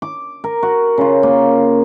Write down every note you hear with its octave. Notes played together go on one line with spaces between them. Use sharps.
D6
A#4
F#4
C#3 F4
A#3